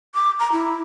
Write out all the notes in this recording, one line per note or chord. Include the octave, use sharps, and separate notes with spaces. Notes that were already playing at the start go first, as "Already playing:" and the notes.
D6
A#5
E4